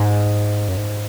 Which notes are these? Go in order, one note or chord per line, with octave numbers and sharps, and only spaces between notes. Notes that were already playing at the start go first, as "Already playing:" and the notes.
Already playing: G#2
F#2
G#2